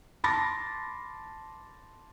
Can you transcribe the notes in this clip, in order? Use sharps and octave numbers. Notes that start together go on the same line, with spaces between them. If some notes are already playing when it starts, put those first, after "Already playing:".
A5 B5 C6 D6 A6 A#6